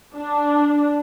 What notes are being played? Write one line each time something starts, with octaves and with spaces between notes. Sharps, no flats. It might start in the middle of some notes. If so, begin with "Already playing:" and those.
D4